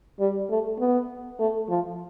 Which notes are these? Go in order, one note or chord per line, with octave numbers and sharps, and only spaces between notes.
G3
A3
B3
A3
F3